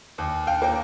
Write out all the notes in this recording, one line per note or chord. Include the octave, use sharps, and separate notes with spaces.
D#2
F5 G5
A#3 G5